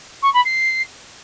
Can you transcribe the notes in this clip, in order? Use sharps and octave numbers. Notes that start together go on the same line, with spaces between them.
C#6
B5
C7